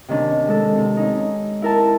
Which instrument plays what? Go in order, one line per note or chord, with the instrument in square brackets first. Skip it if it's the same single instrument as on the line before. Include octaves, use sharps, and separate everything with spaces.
[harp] C3 D#3 C#4 D4
G#3 A4
C3
C#4 D#4
E4 A#4 A5